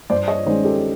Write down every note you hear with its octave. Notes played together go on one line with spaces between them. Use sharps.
G2 C5 D5
C#5 D#5
D#3 G#3 C#4 C5 D5
G4 A4